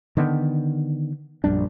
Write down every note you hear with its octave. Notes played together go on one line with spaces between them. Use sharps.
D3 D#3 B3
A#1 F#2 G3 D4